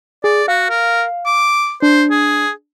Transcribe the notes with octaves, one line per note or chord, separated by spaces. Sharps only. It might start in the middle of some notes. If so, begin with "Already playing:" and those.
G#4 D5
F#4 F5
A#4
D6
D4 C5
G#4